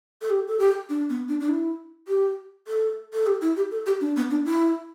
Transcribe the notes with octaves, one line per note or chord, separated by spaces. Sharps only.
A4
G4
A4
G4
D4
B3
D4
D4
E4
G4
A4
A4
G4
E4
G4
A4
G4
D4
B3
D4
E4